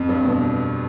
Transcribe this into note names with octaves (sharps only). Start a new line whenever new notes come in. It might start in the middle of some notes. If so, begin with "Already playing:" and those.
Already playing: F2
G2
B2